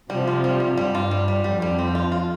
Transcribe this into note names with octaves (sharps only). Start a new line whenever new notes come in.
C3 F3 G3
F4
G3
G3
G2 G3
F4
G3
G3
F2 G3
G3
C4
F4
F4